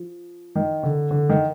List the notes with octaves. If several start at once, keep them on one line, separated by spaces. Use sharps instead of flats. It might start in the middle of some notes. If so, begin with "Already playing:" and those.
Already playing: F3
D#3
D3
D3
D#3